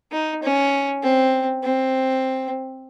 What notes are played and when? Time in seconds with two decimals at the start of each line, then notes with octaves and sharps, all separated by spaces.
0.12 D#4
0.43 C#4
1.03 C4
1.63 C4